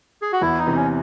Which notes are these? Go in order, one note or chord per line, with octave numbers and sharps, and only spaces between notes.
G#4
F#4
E2 E4
D#4
C3 E3
C#4